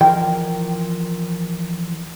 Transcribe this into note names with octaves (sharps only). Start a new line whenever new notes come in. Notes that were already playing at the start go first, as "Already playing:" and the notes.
E3 F3 A#4 G5